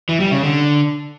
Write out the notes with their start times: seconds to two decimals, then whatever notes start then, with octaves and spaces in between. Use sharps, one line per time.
0.09 E3
0.20 G3
0.32 C#3
0.43 D3